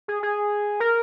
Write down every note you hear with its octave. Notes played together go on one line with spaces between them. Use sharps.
G#4
G#4
A#4